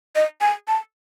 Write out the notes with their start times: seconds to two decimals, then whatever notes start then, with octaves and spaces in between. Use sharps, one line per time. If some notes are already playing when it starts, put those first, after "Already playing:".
0.16 D#5
0.41 G#5
0.68 A5